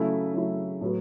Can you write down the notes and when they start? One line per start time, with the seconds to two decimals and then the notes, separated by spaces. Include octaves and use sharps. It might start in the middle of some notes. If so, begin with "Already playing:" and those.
Already playing: C#3 F#3 A3 E4
0.34 C#3 F#3 A3 E4
0.81 A2 F#3 B3 F#4